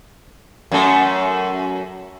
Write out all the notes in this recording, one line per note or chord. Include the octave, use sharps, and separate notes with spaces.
F#2 A3